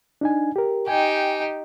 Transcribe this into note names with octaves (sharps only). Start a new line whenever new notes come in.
D4 D#4 G#5
G4 A#4
D#4 G4 G5 G#5